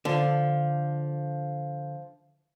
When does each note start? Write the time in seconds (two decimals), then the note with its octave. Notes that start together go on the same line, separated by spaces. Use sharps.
0.05 D3 F3